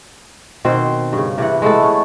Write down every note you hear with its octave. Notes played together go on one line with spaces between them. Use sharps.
B2 D#3 C4 C5
G2 C#3
C3 E3 F#5
G#3 A3 B3 A4
C#4